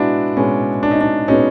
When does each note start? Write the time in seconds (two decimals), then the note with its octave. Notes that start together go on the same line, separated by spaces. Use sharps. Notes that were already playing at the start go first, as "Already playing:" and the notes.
Already playing: B2 G#3 B3 D4 E4 F#4
0.37 B2 G#3 B3 C#4
0.83 D4
0.91 D#4
1.01 D4
1.28 B2 G#3 B3 C#4 D#4